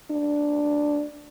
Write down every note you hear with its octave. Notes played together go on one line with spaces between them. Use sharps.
D4